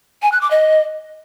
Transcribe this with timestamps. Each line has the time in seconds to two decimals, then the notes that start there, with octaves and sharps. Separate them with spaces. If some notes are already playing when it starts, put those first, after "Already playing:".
0.22 G#5
0.32 F#6
0.41 D6
0.51 D#5